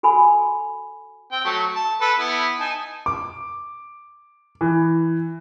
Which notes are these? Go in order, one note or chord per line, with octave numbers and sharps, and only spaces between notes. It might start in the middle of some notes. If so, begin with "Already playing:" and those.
F#4 A4 G#5 B5
C4 G5
F#3 A3
A5
A4 B4
B3 E4
D#4 G#5 A5
D6
E3